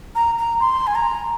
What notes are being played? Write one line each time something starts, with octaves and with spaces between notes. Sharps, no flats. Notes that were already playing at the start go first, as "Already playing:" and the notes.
A#5
A#5
C6
G#5
A#5